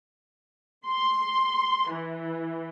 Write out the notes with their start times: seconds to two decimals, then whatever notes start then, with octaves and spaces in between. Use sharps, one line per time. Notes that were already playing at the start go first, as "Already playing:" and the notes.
0.87 C6
1.92 E3